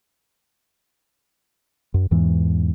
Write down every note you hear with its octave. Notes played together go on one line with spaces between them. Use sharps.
F#2
E2 G#2 E3